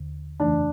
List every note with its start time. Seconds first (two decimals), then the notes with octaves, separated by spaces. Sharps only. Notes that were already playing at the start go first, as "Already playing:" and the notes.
Already playing: D#2 D3
0.40 F2 C#3 E3 A3 D4